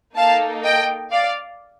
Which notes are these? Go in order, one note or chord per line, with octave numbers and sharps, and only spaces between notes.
A#3 D#4 A4 F5 A5
D#5 G5
D5 F5